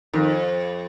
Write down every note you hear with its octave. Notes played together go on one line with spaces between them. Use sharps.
F2 D#3